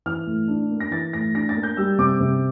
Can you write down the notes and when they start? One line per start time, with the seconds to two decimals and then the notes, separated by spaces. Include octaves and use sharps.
0.06 E3 F6
0.27 A2
0.48 D4
0.71 A#3
0.80 A#6
0.91 E3 A6
1.13 A2 A#6
1.34 D4 A#6
1.49 A6
1.57 A#3
1.63 G6
1.77 G3 E6
1.99 C3 D6
2.20 C3